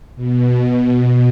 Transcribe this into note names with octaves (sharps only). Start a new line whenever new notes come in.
B2